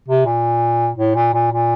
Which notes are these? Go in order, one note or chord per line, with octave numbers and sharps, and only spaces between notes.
C3
A#2
A2
A#2
A#2
A#2